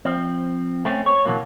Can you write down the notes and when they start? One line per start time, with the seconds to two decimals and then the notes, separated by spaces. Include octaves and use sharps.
0.05 F3 C4
0.85 A3 C4 C#4
1.06 C#5
1.25 B2 E3 F#3 A#3